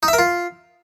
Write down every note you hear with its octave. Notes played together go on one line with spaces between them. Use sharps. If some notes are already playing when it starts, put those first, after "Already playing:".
D#4
E5
A#4
F4